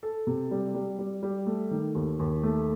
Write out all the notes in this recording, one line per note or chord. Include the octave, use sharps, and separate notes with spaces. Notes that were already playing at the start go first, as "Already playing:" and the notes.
A4
C3
G3
G3
G3
G3
A3
D#3
D#2
D#2
A3